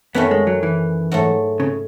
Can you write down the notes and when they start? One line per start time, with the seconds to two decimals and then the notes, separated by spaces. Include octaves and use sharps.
0.14 F#2 D#3 A3 B3 C#4
0.31 G#3
0.47 F#3
0.63 E3
1.12 G#2 F#3 A3
1.60 C#3